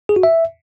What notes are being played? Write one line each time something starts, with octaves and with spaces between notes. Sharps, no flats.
G#4
F#4
E5